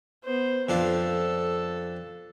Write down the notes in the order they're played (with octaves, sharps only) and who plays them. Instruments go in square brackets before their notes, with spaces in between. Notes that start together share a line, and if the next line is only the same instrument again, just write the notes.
[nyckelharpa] B3 C5
[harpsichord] F2 D4 F4 [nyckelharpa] A4